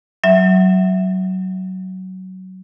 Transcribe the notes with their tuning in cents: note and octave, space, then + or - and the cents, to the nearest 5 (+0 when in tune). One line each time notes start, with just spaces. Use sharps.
F#3 +15 E5 +0